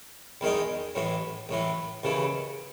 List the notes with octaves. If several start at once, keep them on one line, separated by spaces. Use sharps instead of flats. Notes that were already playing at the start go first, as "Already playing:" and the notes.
E2 D#3 G#3 D#4
A1 A2 E3
A1 A2 E3
D#2 C#3 E3